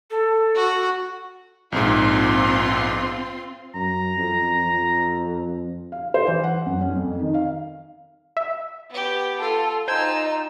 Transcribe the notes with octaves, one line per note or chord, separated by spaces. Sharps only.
A4
F#4
A#1 G#2 C4 F4 C6
F#2 A#5
F2
F2
F5
C5
E3
F#5
F#2
C#4
F2
D#3
F5
E5
B3 G4
F4 A4
D#4 F4 C5 G5 G#5 E6